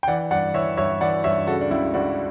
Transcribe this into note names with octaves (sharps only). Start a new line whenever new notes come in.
G5
E3 D5 F#5
G2 D5 F#5
E3 C#5 E5
G2 C#5 E5
E3 D5 F#5
G2 C#5 E5
C#3 F#4 A4
D4
C#2 E4
C#2 D4 F#4